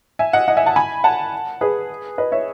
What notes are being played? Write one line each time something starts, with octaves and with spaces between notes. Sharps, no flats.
E5 G#5
D#5 F#5
D#5 F#5
E5 G#5
F#5 A5
G#5 B5
F#5 A5
G#4 B4
B4 D#5
C#5 E5